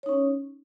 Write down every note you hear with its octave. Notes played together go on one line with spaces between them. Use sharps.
C#4 D#4 C#5